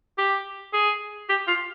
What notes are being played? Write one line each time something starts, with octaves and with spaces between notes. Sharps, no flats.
G4
G#4
G4
F4